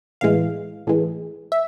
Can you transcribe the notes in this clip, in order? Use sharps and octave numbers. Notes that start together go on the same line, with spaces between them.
A1 A2 E3 G#3 F5
A1 A2 E3 G#3
E5